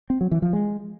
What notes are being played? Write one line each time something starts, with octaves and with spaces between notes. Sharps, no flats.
C4
F#3
E3
F3
G#3